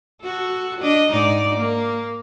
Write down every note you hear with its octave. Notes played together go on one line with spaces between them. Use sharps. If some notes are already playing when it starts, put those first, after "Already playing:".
F#4 A4
D4 D#5
G#2 D#4 D5
A#3